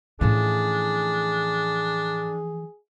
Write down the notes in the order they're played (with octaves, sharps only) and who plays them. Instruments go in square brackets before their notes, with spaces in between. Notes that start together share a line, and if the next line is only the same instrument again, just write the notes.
[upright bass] A2 C#4 [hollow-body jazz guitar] E3 F3 A3 [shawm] D4 [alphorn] G#4